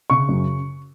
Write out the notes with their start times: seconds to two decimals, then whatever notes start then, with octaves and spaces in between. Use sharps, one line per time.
0.10 C#3 C#6
0.29 F#2